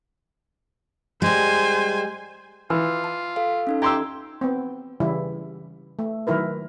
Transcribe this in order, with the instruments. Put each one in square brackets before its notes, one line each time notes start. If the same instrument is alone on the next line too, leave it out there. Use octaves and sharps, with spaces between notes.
[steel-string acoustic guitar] G3 G#3 [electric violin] C5 G#5
[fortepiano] E3 [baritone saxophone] F4 [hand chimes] F6
[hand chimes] A5
A4 F5
C#4 D#4 A4
[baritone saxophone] G4 [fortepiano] A#5 C6 E6 [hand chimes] G#6
[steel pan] B3 C4
C#3 E3 G3 E4
A3
D#3 F#3 E4 A#4 B4